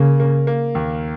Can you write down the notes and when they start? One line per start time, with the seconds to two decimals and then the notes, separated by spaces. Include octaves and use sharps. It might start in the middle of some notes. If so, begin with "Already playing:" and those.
Already playing: C#3 A#3
0.20 A#3
0.47 A#3
0.75 D#2